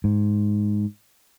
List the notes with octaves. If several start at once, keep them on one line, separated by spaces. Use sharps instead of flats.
G#2